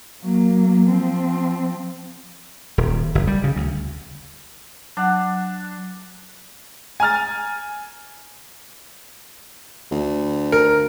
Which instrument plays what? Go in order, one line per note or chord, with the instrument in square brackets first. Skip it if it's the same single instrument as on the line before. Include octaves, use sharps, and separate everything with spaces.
[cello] F#3 A#3
F3 C4
[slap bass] D#1
F#1
G3
C#3
D2
[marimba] F#3 F#5 [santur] D4
[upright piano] G#5 A#5 F6 A6
[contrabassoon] D2
[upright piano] A#4